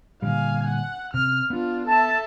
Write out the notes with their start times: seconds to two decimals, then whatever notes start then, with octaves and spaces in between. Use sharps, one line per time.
0.22 A#2 D3 G3 F5 G#5
0.68 F#5
1.14 C3 F6
1.50 B3 D4 F4
1.87 A4 E5 A5